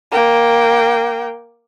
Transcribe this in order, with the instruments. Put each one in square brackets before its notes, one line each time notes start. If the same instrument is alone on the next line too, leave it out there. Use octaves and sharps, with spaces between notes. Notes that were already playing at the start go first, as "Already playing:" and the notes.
[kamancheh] A#3 G5